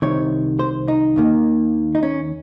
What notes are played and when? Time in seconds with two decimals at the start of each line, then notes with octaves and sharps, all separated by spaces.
0.02 C2 C3 D#3 C#5
0.59 C5
0.88 D#4
1.16 D#2 D#3 A#3
1.95 D#4
2.03 C#4